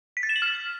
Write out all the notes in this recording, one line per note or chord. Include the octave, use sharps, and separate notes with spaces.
B6
A6
E7
F#7
F6